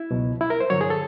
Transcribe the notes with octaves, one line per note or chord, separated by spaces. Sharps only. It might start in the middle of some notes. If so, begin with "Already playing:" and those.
Already playing: E4
C#2 B2 F#3
E4
A#4
C5
G2 D3 F#3 C#5
G#4
A4